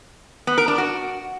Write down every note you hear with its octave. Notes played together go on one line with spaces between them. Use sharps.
B3
A#4
D4
F#4